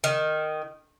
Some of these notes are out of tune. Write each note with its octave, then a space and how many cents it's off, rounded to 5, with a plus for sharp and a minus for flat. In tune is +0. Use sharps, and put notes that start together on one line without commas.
D#3 -10